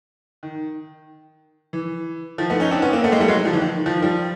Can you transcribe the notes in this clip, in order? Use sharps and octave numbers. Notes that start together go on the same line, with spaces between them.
D#3
E3
D#3 F3
A3 B3
C#4 D#4
C4 D4
B3 C#4
A#3 C4
A3 B3
G#3 A#3
G3 A3
F#3 G#3
D#3 F3
E3
D#3
D#3 F3
F3 G3